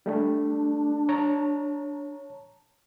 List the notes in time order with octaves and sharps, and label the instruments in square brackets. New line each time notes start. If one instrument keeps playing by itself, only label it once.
[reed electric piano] G3 A3 [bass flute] D4
[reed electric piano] C#5 A5 A#5